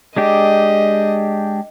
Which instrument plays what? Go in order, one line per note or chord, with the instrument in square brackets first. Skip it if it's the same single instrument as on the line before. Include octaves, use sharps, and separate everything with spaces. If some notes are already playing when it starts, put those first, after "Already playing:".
[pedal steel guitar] G#3 D4 G4 [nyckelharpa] D#5